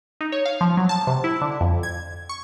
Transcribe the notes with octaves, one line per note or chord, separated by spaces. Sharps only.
D#4
C#5
F5
F3
F#3
A5
C3
E4
D3
F2
G#6
C#6